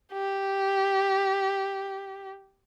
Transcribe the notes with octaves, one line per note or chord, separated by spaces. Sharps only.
G4